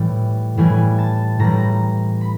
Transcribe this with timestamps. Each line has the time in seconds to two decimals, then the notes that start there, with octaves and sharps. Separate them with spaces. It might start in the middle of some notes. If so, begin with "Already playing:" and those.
Already playing: A2 E3 G3
0.57 A2 E3 G3 G#5
0.98 A5
1.39 A2 E3 G3 A#5
2.21 B5